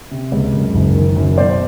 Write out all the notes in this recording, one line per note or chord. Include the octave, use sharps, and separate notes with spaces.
C3
C#2
F#2
F#1
D#3
F#2
B2 C5 D5